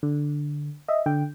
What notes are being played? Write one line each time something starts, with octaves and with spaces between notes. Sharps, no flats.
D3
D#5 E5
D3 G5